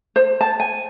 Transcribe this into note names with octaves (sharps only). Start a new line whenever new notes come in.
C5
A5
G#5